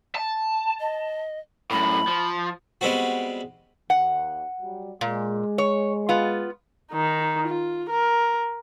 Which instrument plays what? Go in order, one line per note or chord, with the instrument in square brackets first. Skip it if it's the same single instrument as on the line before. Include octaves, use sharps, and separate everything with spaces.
[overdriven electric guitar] A5
[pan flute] D#5
[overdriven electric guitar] F#2 A2 [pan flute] B5
[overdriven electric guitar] F3
[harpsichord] G3 G#3 B3 C4 F#4
[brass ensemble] D#2 [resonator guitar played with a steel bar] F#5
[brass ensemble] F#3 G3
[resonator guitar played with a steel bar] A#2 [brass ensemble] G#3
[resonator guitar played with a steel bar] C#5
B3 F4
[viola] D#3 D#4
F4
A#4